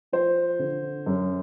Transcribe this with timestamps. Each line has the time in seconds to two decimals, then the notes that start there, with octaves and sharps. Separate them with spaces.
0.12 F3 C5
0.59 D3
1.06 F#2